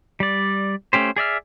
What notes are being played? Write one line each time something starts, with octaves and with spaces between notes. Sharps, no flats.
G3 D5
A3 C#4 G4 C5
G#4 D5 E5 F6